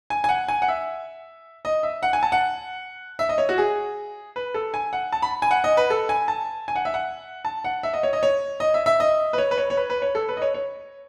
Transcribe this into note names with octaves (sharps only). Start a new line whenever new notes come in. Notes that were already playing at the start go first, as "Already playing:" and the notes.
G#5
G#5
F#5
G#5
F#5
E5
D#5
E5
F#5
G#5
A5
F#5
E5
D#5
C#5
F#4
G#4
B4
A4
G#5
F#5
A5
B5
G#5
F#5
D#5
B4
A4
G#5
A5
G#5
F#5
E5
F#5
A5
F#5
E5
D#5
C#5
D#5
C#5
D#5
E5
E5
D#5
B4
C#5
B4
C#5
C#5
B4
B4
C#5
A4
B4
D#5
C#5
C#5